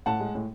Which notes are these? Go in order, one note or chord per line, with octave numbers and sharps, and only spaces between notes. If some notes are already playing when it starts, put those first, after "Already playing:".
A2 F#5 A5
G#3
A2